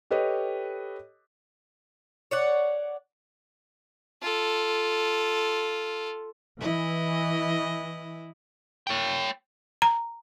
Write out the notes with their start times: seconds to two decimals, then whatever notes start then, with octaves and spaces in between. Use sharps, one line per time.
0.11 G4 A4 B4 C#5 D#5
2.31 C#5 D5 F#5
4.22 F4 A4
6.60 E3 E4 D#5
8.87 C#5 G5
9.82 A#5